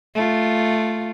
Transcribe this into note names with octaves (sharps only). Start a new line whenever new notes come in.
A3 F4